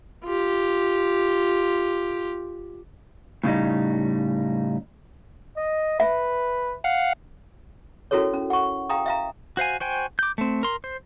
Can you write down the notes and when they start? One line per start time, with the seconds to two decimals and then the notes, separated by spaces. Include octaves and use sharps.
0.24 F4 G4
3.44 A2 C#3 G3 D#4
5.57 D#5
6.00 B4 E5
6.84 F5 F#5
8.11 C#4 E4 F#4 A4 A#4 C#5
8.34 C#4
8.50 F#5 C#6
8.89 F5 G5 A#5 D#6
9.06 E5 F5 A#5
9.57 F#4 C5 F5 G#5
9.80 F#4 C5 G5 G#5
10.19 D6 G6
10.38 A3 C4
10.63 A#4 C6
10.84 C5